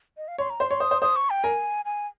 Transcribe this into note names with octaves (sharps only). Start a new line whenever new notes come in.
D#5
F5
C#5 C6
A#5
C5 C6
C#5
C5 D#6
C5
C5 D#6
C#6
G5
A#4 G#5
G#5